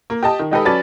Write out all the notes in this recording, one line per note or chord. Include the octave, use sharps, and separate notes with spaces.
A#3
G4 D#5 A5
D#3
G#3 D#4 G4 A4 B4 D#5
F#3 C#4 B4 D5 A5 A6